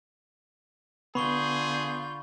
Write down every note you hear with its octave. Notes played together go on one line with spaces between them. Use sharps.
D3 B3 F4 G#4 B5 C#6 G6 G7